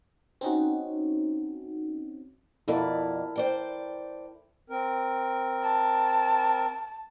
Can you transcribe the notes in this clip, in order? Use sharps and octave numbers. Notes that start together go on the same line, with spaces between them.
C4 C#4 D#4 F#4
F2 B2 E4 A4 A#4 D5
C5 D5 G5
C4 A#4
A5